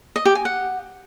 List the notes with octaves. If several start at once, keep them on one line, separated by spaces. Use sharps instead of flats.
D#5
G4
G#5
F#5